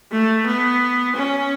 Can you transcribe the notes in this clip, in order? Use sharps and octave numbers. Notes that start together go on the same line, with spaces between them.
A3
B3
C#4